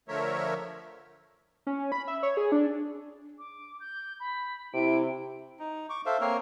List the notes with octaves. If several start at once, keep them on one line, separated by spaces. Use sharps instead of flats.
D3 F3 A3 A#4 C#5 E5
C#4
B5
E5
C#5
G#4
D4
D6
G6
B5
C3 E4 D7
D#4
C#6 D6
A4 C5 E5 F5
A#3 C4 A#4 C#5